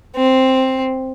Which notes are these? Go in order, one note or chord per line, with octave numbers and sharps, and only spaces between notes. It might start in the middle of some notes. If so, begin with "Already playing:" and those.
C4